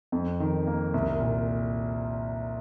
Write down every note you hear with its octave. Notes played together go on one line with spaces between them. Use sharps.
F2
D#3
A#3
C2
A#2